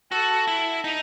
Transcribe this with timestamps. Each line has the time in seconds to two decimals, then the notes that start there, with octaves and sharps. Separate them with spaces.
0.12 F#4 A4
0.47 E4
0.84 D#4